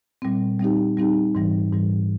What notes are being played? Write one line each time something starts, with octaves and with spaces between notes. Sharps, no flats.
A#2 G3 C4
G3 C4 D#4 G4
G3 C4 D#4 G4
G#2 E3 G3
G#2 E3 G3